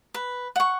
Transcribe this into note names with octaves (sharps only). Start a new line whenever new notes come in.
B4
F#5 C#6